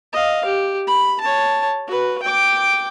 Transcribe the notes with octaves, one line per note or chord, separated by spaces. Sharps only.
D#5 F5
G4
B5
C#5 A5
F#4 B4
G5 D6